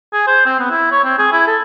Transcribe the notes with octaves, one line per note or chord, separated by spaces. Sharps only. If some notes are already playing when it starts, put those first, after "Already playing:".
G#4
C5
C4
B3
E4
C#5
C4
G#4
E4
A4